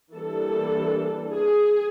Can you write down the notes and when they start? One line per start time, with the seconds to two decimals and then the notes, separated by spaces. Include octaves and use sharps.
0.15 E3 G3 A#3 D4 A4
1.33 G#4